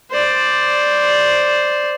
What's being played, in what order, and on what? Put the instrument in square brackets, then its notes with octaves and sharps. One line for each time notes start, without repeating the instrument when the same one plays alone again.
[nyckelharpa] C5 D5